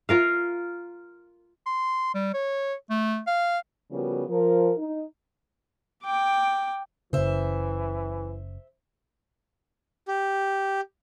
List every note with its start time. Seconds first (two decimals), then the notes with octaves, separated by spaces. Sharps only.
0.09 F4 A#4 F5
1.66 C6
2.15 G3
2.34 C#5
2.90 A3
3.27 F5
3.91 C#3 F3 G3 B3 F#4 A#4
4.29 F3 A#4
4.78 D#4
6.04 G5 D6
7.13 F#1 C#3 E3 C5 E5
10.08 G4